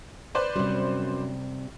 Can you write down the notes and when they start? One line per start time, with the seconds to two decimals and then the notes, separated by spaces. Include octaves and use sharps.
0.35 B4 C5 D5
0.56 F#2 C3 G3